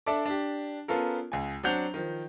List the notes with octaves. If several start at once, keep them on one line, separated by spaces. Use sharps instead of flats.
D4 A4 D5 E5 A5 D6
D4 G4
B3 C#4 F4 A4 A#4
C#2 G#5
F#3 C4 D4 F#5 G6 F7
D#3 F3